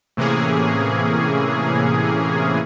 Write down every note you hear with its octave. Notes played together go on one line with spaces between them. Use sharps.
A2 C3 E3 A#3 C#4 G#4